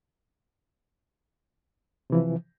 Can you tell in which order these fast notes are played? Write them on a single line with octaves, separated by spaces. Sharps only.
C3 E3 F3